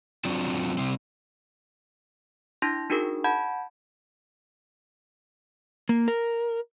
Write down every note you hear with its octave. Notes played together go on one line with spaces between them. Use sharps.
F#3 C4 D4 F4 F#4
C3 G3 C4
D4 E4 C6 G6 A#6
D4 D#4 F#4 G#4 A#4
F#5 A5 B5 G6 G#6
A#3
A#4